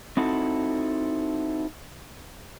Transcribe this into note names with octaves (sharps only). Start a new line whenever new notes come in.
C4 D#4 E4 F#4 A4